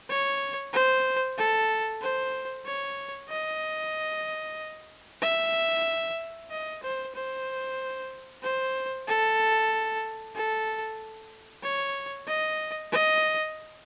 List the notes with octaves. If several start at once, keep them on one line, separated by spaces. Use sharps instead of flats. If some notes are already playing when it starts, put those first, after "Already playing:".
C#5
C5
A4
C5
C#5
D#5
E5
D#5
C5
C5
C5
A4
A4
C#5
D#5
D#5